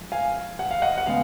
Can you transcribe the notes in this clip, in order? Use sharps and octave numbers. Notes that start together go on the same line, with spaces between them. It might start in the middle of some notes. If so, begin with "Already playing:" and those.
Already playing: F3 G#3
F5 G#5
F#5
F5
D#5 F#5
F#5
C#3 G#3 B3 F5